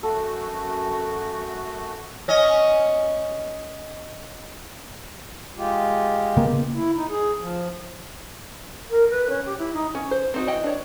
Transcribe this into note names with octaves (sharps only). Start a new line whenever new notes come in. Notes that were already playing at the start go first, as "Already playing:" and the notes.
F#2 A3 F#4 A4
C#4 D#5
G#3 F4 G4
C#3 A#3 B3
E4
D#4
G#4
F3
A#4
B4
C#4
G4
E4
D#4
C#4
C5
C4 D#4 F#4
E3 D#5 G5
D4 C#5